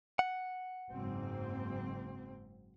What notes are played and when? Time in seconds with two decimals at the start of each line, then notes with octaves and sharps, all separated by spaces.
0.19 F#5
0.91 F#1 G#2 C4